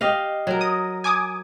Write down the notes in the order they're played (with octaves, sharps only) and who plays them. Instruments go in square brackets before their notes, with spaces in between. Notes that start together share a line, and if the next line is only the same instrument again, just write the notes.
[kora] G4 D#5 F5
F#3 A#4
[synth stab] D#6
G#5 D6 D#6